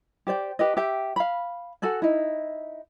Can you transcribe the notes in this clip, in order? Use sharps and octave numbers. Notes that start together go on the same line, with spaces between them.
G4 C5 D5 G5
G4 B4 D#5
G4 E5 G5
F5 B5
F#4 A4 F#5 G#5
D#4 E4